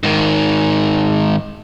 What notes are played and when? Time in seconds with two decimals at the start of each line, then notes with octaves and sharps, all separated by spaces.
0.03 G#2 D#3